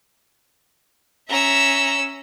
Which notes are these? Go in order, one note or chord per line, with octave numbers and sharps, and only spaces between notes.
C#4 E5 A#5 E6